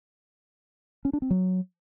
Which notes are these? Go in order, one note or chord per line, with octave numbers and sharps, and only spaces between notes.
C#4
D4
C4
F#3